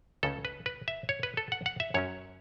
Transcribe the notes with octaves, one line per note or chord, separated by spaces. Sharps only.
C#2 C#3 A3 C#4 A4
B4
B4
E5
C#5
B4
A4
F#5
F#5
E5
F#2 F#3 C#4 C#5